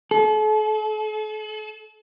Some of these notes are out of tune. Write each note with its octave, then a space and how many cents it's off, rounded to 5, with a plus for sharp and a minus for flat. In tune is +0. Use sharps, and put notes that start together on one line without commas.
A4 -40